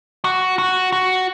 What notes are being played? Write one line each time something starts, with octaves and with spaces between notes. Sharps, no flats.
F#4
F#4
F#4